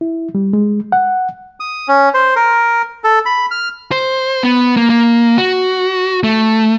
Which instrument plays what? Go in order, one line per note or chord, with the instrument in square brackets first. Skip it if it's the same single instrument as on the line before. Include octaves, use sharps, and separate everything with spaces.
[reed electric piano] E4
G3
G#3
F#5
[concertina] D#6
C#4
C5
A#4
A4
B5
F6
[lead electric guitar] C5
B3
A#3
A#3
F#4
A3